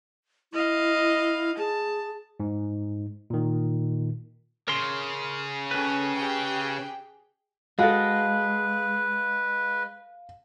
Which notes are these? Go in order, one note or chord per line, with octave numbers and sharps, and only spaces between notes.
E4 D#5 F5
G#4 A5
G#2
A#2 D#3
C#3 A#4 C6
C#4 A4 B4 G5
G4 G#4 G5
G#3 F#4 A4 B4 F5